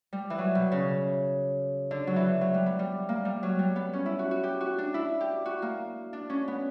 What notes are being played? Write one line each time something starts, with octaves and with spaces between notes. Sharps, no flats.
G3
E3
F#3
B2
C#3
D3
F#3
E3
F#3
G3
B3
G3
A#3
G3
F#3
G3
B3
C#4
E4
F#4
F#4
G4
F#4
D4
E4
G4
F#4
A#3
D4
C#4
B3